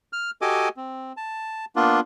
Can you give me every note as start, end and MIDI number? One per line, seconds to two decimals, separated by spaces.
0.13 0.31 89
0.42 0.69 66
0.42 0.69 67
0.42 0.69 69
0.42 0.69 75
0.42 0.69 80
0.42 0.69 86
0.77 1.12 60
1.17 1.65 81
1.76 2.00 58
1.76 2.00 59
1.76 2.00 62
1.76 2.00 65